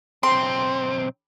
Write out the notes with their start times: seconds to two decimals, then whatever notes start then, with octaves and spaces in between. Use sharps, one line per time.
0.23 B1 C4 C6